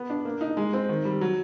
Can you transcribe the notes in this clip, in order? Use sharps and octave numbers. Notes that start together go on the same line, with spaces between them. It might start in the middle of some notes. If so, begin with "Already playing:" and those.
Already playing: B3
D4
A#3
D#4
G#3
C4
D#3
G3
F#3